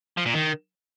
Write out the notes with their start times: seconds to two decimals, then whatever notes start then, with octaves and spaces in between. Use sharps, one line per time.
0.17 F3
0.25 A#2
0.34 D#3